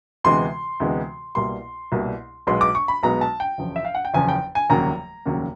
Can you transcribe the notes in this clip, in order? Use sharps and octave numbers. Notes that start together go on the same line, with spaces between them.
D2 C3 E3 G#3 B3 C6
D2 C3 E3 G#3 B3
C2 B2 G3 A#3 C6
C2 B2 G3 A#3
B1 B2 G#3 B3 C6
D6
C#6
B5
B1 B2 G#3 B3 A#5
A5
G5
F#1 E2 C#3 F3
E5
F5
F#5
G5
F#1 E2 C#3 F3 G#5
G5
G#5
F1 D#2 C#3 F#3 A#3 A#5
F1 D#2 C#3 F#3 A#3